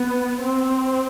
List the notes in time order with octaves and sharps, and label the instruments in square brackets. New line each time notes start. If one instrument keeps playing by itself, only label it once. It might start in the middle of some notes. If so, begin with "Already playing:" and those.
Already playing: [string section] B3
C4